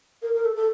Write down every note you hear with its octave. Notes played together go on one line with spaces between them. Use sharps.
A#4
A#4
A4
A4